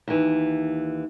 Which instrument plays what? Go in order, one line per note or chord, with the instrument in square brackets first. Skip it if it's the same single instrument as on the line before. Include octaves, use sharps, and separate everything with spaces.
[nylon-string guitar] D#2 E3